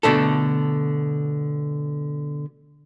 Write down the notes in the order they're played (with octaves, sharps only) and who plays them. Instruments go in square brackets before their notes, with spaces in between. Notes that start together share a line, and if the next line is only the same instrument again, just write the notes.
[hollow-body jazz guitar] B2 D3 A3 A4